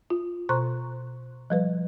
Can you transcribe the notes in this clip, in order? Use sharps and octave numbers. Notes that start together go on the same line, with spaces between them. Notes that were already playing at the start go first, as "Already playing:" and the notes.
F4
B2 C5 A#5 C6 C#6 F#6
F3 G3 B4